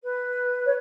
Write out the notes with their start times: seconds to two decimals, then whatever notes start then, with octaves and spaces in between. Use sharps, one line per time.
0.03 B4
0.65 C#5